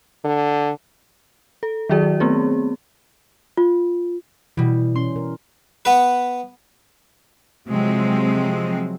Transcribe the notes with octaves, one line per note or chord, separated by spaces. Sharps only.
D3
A4
D#3 F#3 F#4 G#4 D5
A3 B3 C4 G#4
F4
B2 E3 G3
C#4 C6
B2 A#4
B3 B4
C3 F3 F#3 G#3 C4